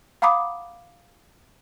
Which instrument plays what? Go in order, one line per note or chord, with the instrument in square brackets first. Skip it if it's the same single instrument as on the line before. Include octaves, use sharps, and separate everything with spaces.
[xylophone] F5 F#5 A#5 B5 D6 D#6